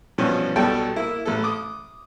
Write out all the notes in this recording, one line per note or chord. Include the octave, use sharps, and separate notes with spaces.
G2 B2 E3 F3 C#4
B1 B2 G3 A4 G5 A5
A#3 E4
A1 A4
D6 D#6